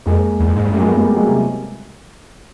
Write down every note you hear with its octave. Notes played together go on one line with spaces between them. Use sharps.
F2 G#3 A#3
E2
F2
G#2
G2
F#2 G3 A3
G#3 A#3
A3 B3
G#3 A#3
G3 A3
F#3 G#3
C3